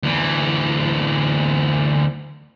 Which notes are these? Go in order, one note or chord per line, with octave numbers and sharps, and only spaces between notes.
D2 E3